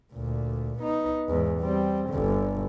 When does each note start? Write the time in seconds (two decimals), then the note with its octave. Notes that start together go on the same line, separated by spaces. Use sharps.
0.13 D2 A#2
0.79 B3 D#4
1.29 E2 G#2
1.60 G3 C4
2.10 G1 D3